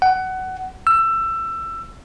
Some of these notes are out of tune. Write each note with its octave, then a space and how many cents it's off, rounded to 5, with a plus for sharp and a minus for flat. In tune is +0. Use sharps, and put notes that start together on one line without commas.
F#5 +20
E6 +20